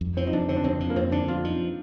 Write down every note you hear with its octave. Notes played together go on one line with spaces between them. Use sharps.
F2
F3 C4
D#4
F2 D4
D3 C4
D4
F2 C4
F3
A#3
F2 C4
D3 D4
F2 F4
F3 D#4